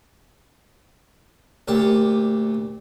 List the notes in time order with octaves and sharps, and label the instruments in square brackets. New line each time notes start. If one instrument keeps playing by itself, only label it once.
[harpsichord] D2 A#2 G4 A5